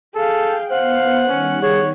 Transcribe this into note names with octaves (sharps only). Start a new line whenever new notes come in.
G#4 A4 F5 G5
B3 C5 F5 F#5
D#3 G3 C#4
G#4 C#5